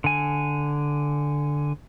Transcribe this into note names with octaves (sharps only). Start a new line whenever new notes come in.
D3 G#5